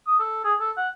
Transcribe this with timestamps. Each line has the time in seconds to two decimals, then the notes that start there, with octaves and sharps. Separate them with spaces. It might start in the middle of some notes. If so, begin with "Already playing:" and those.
0.07 D#6
0.19 A4
0.44 G#4
0.59 A4
0.77 F#5